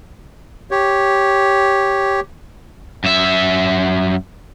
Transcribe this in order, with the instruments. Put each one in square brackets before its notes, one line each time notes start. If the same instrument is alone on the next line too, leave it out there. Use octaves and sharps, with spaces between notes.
[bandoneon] G4 C#5
[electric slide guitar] F#2 E5